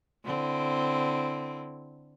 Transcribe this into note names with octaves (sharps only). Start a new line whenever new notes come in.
D3 C4 E4